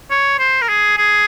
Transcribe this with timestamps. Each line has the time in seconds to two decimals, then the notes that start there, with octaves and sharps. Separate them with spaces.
0.11 C#5
0.39 C5
0.62 A#4
0.69 G#4
0.98 G#4